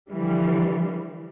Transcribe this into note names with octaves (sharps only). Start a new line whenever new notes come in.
D3 E3 F3 G3